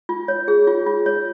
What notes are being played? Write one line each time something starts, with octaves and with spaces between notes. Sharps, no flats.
F4
C#5
G#4
F4
F4
C#5